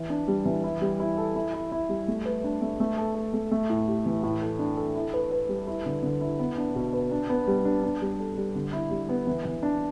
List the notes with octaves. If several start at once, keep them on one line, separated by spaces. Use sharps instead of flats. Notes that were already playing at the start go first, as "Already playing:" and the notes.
Already playing: E3
D4
G3
E3
E4
G3
E4
A4
E4
E4
E4
G3
A3
B4
D4
A3
A3
A4
A4
A3
A3
A2
G4
E3
A2
A4
D4
A4
E4
B4
B4
G3
E4
D3
D3
E4
B3
D4
B2
B4
D4
B3
G3
D4
D4
G3
A4
G3
D3
E4
G3
B3
E3
E3
D4